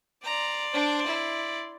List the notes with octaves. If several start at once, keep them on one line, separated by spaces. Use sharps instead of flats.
D5 A#5 C6
D4 C5
E4